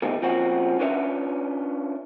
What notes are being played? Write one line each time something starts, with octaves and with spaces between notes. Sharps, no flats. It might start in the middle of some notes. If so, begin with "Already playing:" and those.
B2 D3 D#3 G3 A3 C4
A#2 F3 C4 C#4 F#4
C#4 D4 F4 B4 C#5 E5